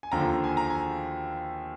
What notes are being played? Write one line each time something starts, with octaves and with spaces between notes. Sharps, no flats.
G#5
D#2 D3 F3 A#5
G#5
A#5
G#5